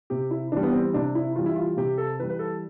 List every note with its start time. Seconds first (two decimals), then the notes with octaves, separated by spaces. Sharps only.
0.10 C3 G4
0.31 E4
0.52 E3 G3 D4
0.63 B3
0.73 C4
0.94 C3 D4
1.15 E4
1.36 E3 G3 F4
1.46 E4
1.56 F4
1.77 C3 G4
1.98 A4
2.19 E3 B4
2.23 G3
2.30 B4
2.39 A4